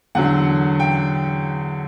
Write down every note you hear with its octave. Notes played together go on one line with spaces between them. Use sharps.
E2 D3 F#3 F#5
G5